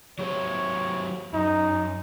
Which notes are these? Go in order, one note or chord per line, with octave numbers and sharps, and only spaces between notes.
F#3 G4 C5 C#5
F#2 D#4